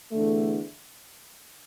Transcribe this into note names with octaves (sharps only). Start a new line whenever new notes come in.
E2 D3 A3